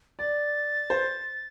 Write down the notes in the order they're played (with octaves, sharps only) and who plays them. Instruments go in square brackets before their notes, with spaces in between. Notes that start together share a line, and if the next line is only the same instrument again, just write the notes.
[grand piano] D5 [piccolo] A6
[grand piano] C5